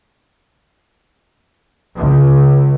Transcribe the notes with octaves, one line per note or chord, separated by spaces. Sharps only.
C#2